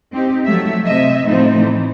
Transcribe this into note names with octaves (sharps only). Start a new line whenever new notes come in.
C4 D#4 G4
F3 F#3 A3 E5
C3 D#5 E5
A2 F3 A3 C4 D#4
E3